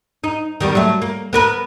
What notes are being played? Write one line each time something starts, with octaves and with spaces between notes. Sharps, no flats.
D#4
D#3 G3 B3
F#3 A3
A#3
B3 A#4 B4